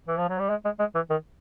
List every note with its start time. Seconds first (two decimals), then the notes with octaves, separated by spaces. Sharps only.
0.08 E3
0.18 F3
0.29 F#3
0.39 G3
0.50 G#3
0.65 G#3
0.79 G#3
0.95 E3
1.10 D#3